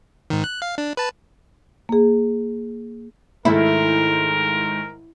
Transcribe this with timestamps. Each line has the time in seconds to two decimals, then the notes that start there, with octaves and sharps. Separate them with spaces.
0.30 G#2 D#3
0.44 F#6
0.62 F5
0.78 D4
0.97 B4 A5
1.89 A#3 G#4
3.45 G#2 D#3 A3 E4 A#4